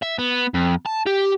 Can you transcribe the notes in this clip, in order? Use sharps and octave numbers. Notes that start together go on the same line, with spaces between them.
E5
B3
F2
A5
G4